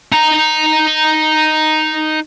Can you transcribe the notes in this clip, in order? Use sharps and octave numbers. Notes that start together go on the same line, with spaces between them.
D#4 A#5